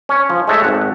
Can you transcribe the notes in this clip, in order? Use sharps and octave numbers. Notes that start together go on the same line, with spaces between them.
C#4 C#5
F3
G#3 A3 C#5 E5
G#1 F#5